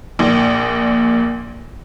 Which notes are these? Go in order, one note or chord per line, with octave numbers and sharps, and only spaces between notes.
A#1 A#2